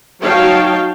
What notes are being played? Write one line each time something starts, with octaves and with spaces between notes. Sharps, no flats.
F#3 D#4 C#5 F5 G5 A5